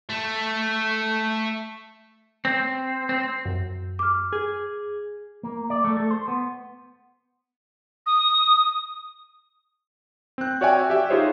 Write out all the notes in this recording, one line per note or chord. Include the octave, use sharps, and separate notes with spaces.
A3
C4
C4
F#2
D6 F6
G#4
A#3
D5
A3
A4
C5
B3
D#6
C4 F#6
F#4 C#5 D5 E5 G5 G#5
G4 E5
D#4 F4 G4 G#4 C5 C#5